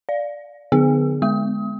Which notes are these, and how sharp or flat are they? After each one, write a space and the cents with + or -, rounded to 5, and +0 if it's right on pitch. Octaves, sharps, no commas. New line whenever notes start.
D5 -5 F5 +0
D3 +0 B3 +30 G#4 +0
G#3 +0 B3 +0 D#6 +30